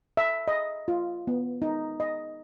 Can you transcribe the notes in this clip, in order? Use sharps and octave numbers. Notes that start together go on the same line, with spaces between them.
E5
D#5
F4
B3
D#4
D#5